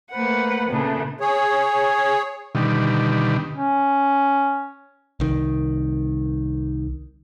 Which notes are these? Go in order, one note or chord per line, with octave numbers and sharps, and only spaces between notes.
A3 A#3 B4 C5 F#5
A#2 C#3 A3 B3 D4
G#4 C#5
B2 D3 D#3 G3
C#4
C2 D#3